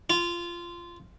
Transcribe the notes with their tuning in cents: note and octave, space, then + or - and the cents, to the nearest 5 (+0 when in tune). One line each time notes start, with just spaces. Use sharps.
F4 -15